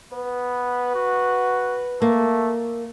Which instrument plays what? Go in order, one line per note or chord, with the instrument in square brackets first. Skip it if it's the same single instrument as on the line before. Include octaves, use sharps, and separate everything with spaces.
[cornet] B3 [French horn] B4
[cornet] F#4
[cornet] A3 [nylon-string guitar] A#3